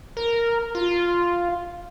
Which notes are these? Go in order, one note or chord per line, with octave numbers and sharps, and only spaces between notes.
A#4
F4